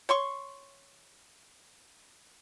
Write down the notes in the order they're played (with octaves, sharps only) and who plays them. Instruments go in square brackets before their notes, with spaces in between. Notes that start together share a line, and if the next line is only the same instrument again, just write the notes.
[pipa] C#5 C6 C#6